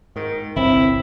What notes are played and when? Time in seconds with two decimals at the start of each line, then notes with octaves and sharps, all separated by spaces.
0.16 G#2 D#3
0.56 G1 C2 C4 E4